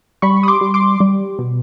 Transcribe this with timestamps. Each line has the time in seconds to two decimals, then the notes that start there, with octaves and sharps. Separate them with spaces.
0.22 G3 B5 C#6
0.43 D#6
0.48 C6 D6
0.61 G3
0.74 C6 D6
1.00 G3
1.39 B2